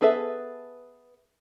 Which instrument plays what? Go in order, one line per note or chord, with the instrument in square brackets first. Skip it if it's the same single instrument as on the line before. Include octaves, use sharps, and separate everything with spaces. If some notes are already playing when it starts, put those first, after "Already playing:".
[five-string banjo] B3 G#4 A4 B4 E5